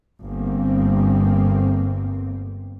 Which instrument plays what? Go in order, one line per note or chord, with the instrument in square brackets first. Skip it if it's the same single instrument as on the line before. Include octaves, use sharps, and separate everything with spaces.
[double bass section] G1 A#3 C4